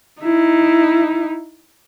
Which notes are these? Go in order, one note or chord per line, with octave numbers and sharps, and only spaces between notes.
D#4 E4